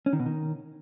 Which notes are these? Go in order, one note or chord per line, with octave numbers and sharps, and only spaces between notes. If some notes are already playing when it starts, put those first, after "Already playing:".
C#4
D#3
B2
D#3